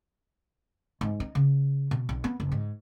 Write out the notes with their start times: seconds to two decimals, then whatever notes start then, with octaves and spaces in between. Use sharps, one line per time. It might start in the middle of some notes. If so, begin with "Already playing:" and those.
1.01 G#2
1.20 D#4
1.35 C#3
1.91 B2
2.09 B1
2.24 B3
2.40 F#1
2.52 G#2